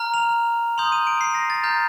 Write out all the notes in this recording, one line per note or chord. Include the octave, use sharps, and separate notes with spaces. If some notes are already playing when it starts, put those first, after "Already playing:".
Already playing: A#5 F6
F7
C6 D#6 G6 F7
D#7
D7
C7
A#6
A6
A#5 F6 G6